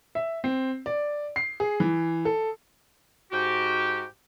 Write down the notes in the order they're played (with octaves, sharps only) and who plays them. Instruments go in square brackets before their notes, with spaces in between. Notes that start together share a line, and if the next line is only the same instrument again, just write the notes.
[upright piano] E5
C4
D5
C7
G#4
E3
A4
[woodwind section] G#2 F#4 G4